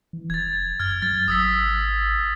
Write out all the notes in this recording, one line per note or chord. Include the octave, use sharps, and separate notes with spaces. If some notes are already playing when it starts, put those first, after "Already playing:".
E3
F1 G#6 A6
F#2 F6 G#6
F#3 A6
G#1 D#6 E6 B6